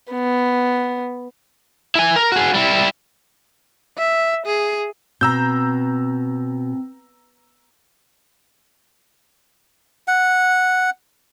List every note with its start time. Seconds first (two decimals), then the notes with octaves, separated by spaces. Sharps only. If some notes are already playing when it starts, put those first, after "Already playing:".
0.11 B3
1.95 E4 G#5
2.16 A#4
2.32 F#4 G#4
2.54 G3 E4
3.97 E5
4.46 G#4
5.21 B2 C4 A#5 E6 G6
10.08 F#5